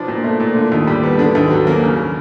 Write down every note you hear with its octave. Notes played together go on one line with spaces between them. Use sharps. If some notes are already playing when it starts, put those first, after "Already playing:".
Already playing: B2 F3 D4
A#2
A3
A#2
D3
D#2
G3
B3
D3 D4
D#2
F#3
A#3
C#3